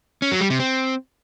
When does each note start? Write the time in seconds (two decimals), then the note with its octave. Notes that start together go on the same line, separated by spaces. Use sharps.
0.22 C#4
0.31 F#3
0.41 G3
0.50 C3
0.60 C4